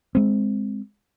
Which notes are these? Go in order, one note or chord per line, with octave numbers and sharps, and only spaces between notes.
G#3 C4